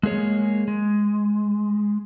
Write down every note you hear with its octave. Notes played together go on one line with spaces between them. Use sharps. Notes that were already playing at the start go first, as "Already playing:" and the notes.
G#3 A#3 G#4 C#5
G#3